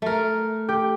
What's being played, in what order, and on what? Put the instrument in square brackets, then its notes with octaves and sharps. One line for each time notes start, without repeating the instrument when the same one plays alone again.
[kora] A3 A#4
[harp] G4